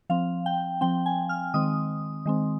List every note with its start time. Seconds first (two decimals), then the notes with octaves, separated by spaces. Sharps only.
0.09 F3 C4 F5
0.46 G5
0.81 F3 C4 G5
1.06 G#5
1.29 F6
1.54 D#3 G#3 C4 D#6
2.26 D#3 G#3 C4